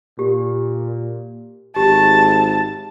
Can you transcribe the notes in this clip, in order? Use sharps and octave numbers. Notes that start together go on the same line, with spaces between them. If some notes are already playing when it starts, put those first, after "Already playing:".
A#2 G4
G#1 G4 A5